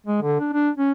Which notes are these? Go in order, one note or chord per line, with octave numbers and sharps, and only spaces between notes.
G#3
D3
D4
D4
C#4